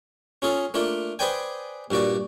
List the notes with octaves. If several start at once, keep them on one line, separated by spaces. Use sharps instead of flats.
C#4 F4 G#4 A4
A3 A#3 D4 F4
G#4 B4 C5 D5 G5 G#5
G2 A#2 F#4 D5